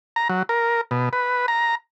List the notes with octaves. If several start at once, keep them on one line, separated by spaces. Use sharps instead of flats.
A#5
F#3
A#4
B2
B4
A#5